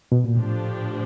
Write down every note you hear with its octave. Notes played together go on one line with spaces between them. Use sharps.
B2
A#2
A2 F3 A3 D4 G4